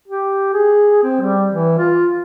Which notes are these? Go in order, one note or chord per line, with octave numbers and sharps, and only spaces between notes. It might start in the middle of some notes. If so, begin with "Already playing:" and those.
G4
G#4
C4
G3
E3
F4